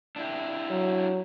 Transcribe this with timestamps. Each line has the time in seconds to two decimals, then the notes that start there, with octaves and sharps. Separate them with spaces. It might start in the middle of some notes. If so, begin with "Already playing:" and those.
0.16 D4 E4 G4
0.70 F#3